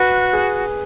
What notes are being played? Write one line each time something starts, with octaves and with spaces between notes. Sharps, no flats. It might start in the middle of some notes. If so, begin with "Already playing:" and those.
Already playing: F#4 B4
G#4